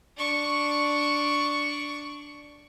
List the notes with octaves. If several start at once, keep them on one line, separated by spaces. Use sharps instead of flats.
D4 C#6